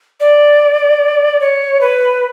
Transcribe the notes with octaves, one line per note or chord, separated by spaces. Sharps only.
D5
C#5
B4